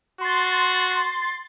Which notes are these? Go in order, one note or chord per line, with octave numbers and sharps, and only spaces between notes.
F#4 C6 A6